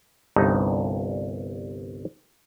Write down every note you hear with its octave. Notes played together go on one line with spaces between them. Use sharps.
G1 C2 G2 D#4